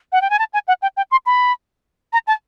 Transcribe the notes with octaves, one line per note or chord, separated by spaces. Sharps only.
F#5
G5
G#5
A5
G#5
F#5
G5
G5
C6
B5
A#5
A5